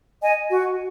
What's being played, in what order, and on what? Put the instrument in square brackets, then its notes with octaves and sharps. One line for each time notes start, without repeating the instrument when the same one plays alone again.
[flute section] D#5 G#5
F#4